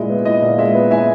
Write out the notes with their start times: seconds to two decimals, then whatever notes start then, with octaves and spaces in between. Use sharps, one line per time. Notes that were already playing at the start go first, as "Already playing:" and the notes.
Already playing: A#2 G#3 E4 D#5
0.10 B3
0.25 E4 D#5
0.42 A#2
0.58 G#3 E5
0.75 B3
0.91 E4 E5 G#5